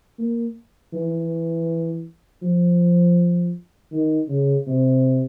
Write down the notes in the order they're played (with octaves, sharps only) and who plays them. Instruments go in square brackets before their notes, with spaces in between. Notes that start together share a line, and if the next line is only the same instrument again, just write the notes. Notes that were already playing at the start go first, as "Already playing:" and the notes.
[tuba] A#3
E3
F3
D#3
C#3
C3